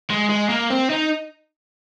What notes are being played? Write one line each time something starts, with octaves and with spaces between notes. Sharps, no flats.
G#3
G#3
A#3
C4
D#4